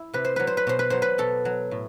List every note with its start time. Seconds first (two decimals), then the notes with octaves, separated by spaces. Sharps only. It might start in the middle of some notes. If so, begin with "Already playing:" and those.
Already playing: E4
0.13 C3 B4
0.25 C5
0.36 F#3 B4
0.47 C5
0.57 B4
0.67 B2 C5
0.79 B4
0.90 F#3 C5
1.02 B4
1.18 B2 A4
1.45 F#3
1.71 A2